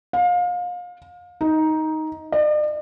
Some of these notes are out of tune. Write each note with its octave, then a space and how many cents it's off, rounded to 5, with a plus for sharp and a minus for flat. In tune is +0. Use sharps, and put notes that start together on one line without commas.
F5 +30
D#4 +10
D5 +45